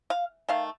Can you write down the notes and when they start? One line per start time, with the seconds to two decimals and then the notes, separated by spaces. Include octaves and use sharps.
0.10 F5
0.49 D#3 A3 F5